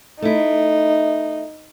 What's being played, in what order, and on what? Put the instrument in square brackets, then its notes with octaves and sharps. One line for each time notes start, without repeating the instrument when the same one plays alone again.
[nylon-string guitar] A3 E4 [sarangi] D#4